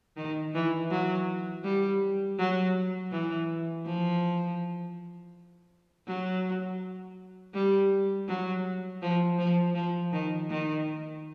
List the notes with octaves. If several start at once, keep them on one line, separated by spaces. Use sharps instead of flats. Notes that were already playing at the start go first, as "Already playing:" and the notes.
D#3
E3
F#3
G3
F#3
E3
F3
F#3
G3
F#3
F3
F3
F3
D#3
D#3